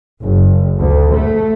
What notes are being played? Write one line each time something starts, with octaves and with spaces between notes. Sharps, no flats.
F#1
D2
A3